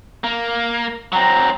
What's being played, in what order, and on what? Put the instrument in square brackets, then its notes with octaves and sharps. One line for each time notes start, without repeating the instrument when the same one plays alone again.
[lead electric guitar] A#3
[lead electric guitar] F#3 C4 [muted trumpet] A#5